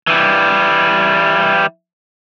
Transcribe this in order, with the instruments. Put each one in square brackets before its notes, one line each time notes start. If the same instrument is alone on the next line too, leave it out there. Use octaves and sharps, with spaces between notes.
[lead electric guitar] E3 G3